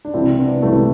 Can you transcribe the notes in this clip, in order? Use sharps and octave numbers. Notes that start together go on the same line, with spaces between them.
D4
C2 C3 E3 C4 E4
B3 D4
C2 C3 E3 A3